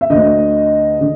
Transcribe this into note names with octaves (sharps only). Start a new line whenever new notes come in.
E5
D2 D3 D#5
D3